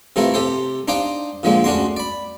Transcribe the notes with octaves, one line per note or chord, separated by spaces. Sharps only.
C3 E3 A3 E4 F4 A#4
C3 G4 A4 C5
D4 D#4 C5 F5 G5 D6
A#2 D3 F3 G#3 A#3
D2 C#4 D4 F#4 C6
D5 B5